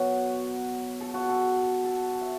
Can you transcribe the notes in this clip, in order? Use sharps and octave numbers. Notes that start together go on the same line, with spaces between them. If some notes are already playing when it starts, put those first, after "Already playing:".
Already playing: B2 F#3 F#4
A4
F#4
A4
A4
E5